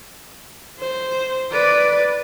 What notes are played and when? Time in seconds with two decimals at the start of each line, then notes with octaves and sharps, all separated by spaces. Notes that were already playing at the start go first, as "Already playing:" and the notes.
0.79 C5
1.52 B4 D5